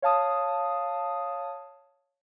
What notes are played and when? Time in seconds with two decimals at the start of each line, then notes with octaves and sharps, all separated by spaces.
0.02 C#5 F5 A5 D#6